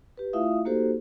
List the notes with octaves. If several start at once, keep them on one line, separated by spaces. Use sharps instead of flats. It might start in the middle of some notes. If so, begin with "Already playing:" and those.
G4 B4
A3 E4 F4 E5 F5 D#6
A#3 D#4 F#4 G4 A4 C5